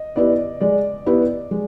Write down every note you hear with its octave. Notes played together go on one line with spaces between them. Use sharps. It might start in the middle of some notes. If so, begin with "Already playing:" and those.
Already playing: D#5
B3 E4 G4 B4 D5
G#3 D5
B3 E4 G4 B4
G#3